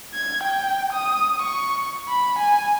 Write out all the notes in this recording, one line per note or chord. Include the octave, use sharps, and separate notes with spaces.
G#6
G5
D#6
C#6
B5
G#5